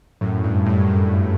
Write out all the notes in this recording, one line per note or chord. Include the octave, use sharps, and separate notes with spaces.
F#2 A2
G2
F#2 A2
F#2
G2